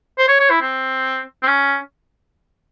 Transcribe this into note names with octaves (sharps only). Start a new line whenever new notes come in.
C5
C#5
C#5
E4
C4
C4
C#4